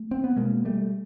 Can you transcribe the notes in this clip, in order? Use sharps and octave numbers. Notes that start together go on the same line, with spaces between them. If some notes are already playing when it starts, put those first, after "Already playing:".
Already playing: A3
C4
B3
B2 G#3 A#3
G3 A3